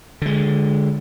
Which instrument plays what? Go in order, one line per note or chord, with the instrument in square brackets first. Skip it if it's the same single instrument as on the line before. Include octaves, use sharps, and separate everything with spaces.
[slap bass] D3 G#3